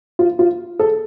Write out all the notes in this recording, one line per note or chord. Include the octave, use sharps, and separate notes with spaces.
F4
F4
A4